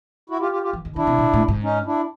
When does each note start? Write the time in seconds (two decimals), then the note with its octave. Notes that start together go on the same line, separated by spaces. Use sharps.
0.30 E4 F#4
0.40 F4 G4
0.52 F4 G4
0.63 F4 G4
0.73 E3
0.85 D#3
0.96 D3 D4 E4
1.07 C3
1.18 A#2
1.33 A2
1.48 G#2
1.63 C#4 D#4
1.86 D4 E4